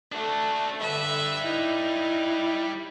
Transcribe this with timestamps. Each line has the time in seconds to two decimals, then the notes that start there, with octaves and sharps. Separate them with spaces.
0.12 A3 D4 F#4
0.81 D3 G3 B4 E5
1.44 D#4 E4